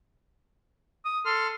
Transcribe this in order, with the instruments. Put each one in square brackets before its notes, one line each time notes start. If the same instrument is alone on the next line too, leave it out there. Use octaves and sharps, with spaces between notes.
[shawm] D#6
[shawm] A4 [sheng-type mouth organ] C6 F6